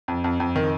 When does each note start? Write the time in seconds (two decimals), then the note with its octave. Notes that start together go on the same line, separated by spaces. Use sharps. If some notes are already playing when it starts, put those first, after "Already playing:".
0.08 F2
0.24 F2
0.40 F2
0.56 D#3